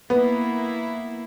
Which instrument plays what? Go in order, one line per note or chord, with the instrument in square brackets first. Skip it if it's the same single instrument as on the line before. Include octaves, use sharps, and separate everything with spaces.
[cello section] A#3 E4 [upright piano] B3